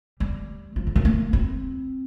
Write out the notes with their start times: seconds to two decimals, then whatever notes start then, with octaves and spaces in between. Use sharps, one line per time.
0.20 G3
0.76 F3
0.87 D3
0.95 D#3
1.05 A#3
1.33 C4